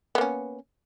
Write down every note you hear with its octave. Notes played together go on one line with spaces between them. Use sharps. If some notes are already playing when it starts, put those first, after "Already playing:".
A#3 B3 C#4